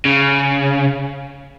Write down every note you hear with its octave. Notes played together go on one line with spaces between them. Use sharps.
C#3